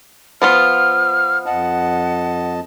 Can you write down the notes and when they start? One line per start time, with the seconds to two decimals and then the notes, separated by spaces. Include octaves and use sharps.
0.42 F3 B3 F4 F6
1.46 F2 D#5 F#5 A5